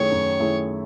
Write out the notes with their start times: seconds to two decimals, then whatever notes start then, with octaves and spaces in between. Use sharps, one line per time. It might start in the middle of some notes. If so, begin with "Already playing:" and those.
Already playing: F#2 D#3 A3 E4 G#4 C#5
0.12 F#2
0.39 D#3 A3 E4 G#4